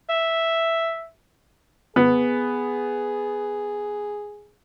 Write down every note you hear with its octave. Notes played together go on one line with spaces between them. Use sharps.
E5
B3 G#4